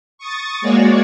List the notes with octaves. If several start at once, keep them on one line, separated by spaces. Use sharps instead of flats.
C#6 D#6 A6
G#3 A#3 F#4 C#5 D5